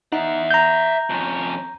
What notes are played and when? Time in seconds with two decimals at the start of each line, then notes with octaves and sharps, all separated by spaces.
0.12 D#4 E5 F#5
0.51 A#5 G6
1.10 F2 C#4